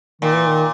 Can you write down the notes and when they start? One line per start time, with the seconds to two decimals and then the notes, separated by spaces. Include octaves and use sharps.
0.22 A#2 D#3
0.35 E3
0.47 D#3